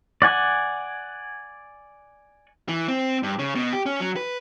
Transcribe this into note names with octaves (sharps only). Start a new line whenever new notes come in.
D5 F#5 G#5
E3
C4
G2
C#3
B2
G4
C#4
F#3
B4